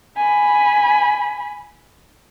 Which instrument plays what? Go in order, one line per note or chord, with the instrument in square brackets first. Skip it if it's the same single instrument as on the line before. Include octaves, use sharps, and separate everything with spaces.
[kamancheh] G#5 B5